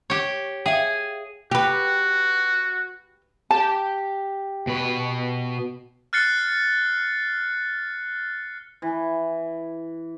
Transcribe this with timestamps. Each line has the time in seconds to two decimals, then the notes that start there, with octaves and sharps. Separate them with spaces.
0.10 G4 C#5 C#6
0.66 G#4 E5 F5 G5
1.51 F#4 G4 B4
3.51 G4 A5
4.67 B2 B4
6.13 F6 F#6 A6 C7 C#7 G7
8.82 E3